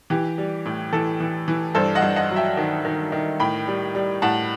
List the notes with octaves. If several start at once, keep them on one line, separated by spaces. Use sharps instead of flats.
E3 G4
G3
A2
E3 A4
E3
E3
G2 A4 C5
D#5 F#5
G2
D#5 F#5
F#3
E5 G5
D#3
D#3
D#3
A2 G5 B5
G3
G3
A2 F#5 A5